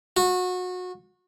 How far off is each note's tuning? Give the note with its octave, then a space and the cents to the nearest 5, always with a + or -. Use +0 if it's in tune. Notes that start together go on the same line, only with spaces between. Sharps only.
F#4 -25